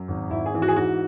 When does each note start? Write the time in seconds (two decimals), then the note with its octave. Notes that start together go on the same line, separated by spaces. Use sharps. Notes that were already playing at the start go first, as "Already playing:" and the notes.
Already playing: F#2
0.08 G#1
0.30 G#1 E4
0.46 G#4
0.54 E3
0.62 F#4
0.68 G#4
0.76 G#2 F#4